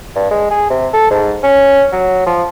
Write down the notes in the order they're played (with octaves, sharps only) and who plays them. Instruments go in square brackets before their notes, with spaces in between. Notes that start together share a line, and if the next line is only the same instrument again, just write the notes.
[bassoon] G2
G#3
G#4
C3
A4
G#2
C#4
F#3
F3